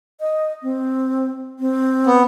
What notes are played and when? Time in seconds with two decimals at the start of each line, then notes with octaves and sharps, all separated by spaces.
0.20 D#5
0.63 C4
1.59 C4
2.07 B3